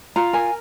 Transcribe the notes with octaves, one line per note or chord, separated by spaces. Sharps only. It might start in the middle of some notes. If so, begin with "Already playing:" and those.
F4 A#5
A#4 G#5